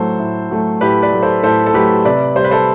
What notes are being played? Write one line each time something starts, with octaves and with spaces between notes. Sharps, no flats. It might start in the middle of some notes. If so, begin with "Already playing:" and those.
Already playing: A2 F#3 A3 A4 C5
A2
F#3 A3
A2 G4 B4
B4 D5
F#3 A3
A4 C5
A2 A4 C5
A4
F#3 A3 G4 B4
C3 B4 D5
G3 C5
B4
A4 C5